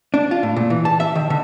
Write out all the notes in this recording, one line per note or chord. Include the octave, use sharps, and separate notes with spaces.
D4
F4
A2
A#2
E3
A5
E5
D#3
D3